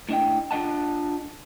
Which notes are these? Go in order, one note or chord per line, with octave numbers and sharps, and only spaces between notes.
A2 D4 D#5 G5
D4 F4 D#5 F#5 A5